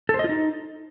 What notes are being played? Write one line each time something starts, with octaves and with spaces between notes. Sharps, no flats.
A4
C5
D#5
F4
D#4